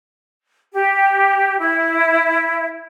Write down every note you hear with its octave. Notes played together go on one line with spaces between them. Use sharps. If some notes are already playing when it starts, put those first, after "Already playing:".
G4
E4